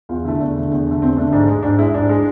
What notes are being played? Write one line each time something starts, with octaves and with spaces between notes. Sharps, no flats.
E2 F4
D3 A3 E4
E2 D4
D3 A3
E2
D3 A3
E2 C4
D3 A3 D4
G#2 D4
G#3
G#2 D4
G#3 E4
G#2 D4
G#3